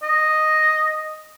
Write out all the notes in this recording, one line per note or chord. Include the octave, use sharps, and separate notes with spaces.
D#5